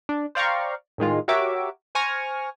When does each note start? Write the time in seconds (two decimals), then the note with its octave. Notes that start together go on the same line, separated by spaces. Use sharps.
0.09 D4
0.35 C5 D5 F5 G5 A#5 C#6
0.98 A2 D#3 G#3 F4
1.28 F#4 G4 A#4 C#5 E5 D6
1.95 C5 G#5 C#6 F6 A#6